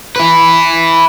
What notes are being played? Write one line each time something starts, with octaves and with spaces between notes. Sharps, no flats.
E4 B4